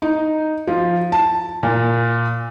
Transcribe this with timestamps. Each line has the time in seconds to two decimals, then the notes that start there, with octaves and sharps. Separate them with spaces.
0.02 D#4
0.67 F3
1.12 A5
1.63 A#2